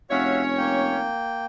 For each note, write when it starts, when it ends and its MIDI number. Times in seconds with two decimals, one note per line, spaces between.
0.10 1.11 29
0.10 0.96 61
0.10 0.42 66
0.10 0.96 73
0.10 0.42 76
0.10 0.42 77
0.57 1.46 58
0.57 1.46 79